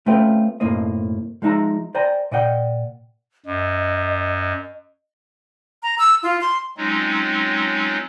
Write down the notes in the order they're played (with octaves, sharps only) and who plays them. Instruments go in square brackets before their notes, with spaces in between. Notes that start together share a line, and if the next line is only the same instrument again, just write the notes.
[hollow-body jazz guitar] A3 C4 C#4 F4 B4 G5
B1 F#2 A2 A#3 C4 D#5
F3 G#3 D#4 E5 A#5
C5 D5 G5 G#5 A#5
A#2 D5 D#5 F#5 G5
[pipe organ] F#2 [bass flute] D#5
[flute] A#5
E6
F4
C6
[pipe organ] F#3 G#3 C4 C#4 D#4 F4